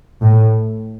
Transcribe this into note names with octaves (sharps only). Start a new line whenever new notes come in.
A2